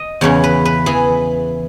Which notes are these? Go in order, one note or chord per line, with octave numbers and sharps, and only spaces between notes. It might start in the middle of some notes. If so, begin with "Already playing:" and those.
Already playing: D#5
E2 C#3 E3 C#5
B4
B4
E3 G#4